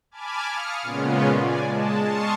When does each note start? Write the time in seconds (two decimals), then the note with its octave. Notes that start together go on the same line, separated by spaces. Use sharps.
0.11 G#5 A5 B5 D6 F6 G#6
0.49 F5 D#6 F6 C#7
0.82 A#2 C#3 G#3 B3 C#4 F4
1.33 D5 G#5
1.64 G#3 A5
2.02 A5 C6 C#6 D#6 F6 C#7